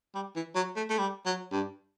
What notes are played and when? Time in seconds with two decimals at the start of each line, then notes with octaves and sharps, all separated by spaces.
0.15 G3
0.36 E3
0.55 F#3
0.76 A3
0.90 A3
0.98 G3
1.26 F#3
1.52 G2